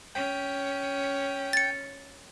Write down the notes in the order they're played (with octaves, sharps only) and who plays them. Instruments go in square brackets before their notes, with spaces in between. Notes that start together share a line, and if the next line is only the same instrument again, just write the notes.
[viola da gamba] C#4 [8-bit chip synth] G5
[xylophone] A6 C#7